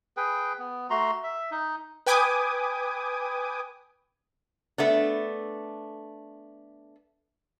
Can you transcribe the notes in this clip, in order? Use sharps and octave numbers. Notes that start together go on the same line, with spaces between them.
G#4 B4 G5
B3
A3 F#4 A#5 C6
E5
D#4
B4 G5 G#5 D6 D#6
A3 B3 D4